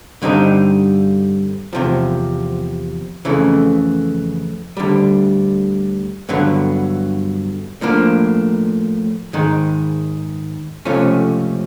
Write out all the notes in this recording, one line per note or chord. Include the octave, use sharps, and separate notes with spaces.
G2 D3 G3 C4 D#4
E2 C3 F3
F2 C#3 E3 A3
D2 D3 G3
G2 D3 F#3 B3
A2 F3 A#3 D4
G#2 D#3 G#3
C#2 C3 F3 A3 C#4